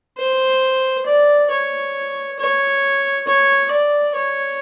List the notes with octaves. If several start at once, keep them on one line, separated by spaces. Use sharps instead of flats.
C5
D5
C#5
C#5
C#5
D5
C#5